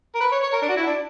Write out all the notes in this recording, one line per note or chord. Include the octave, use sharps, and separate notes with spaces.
A#4
B4
C#5
C#5
A#4
D4
F#4
E4
D4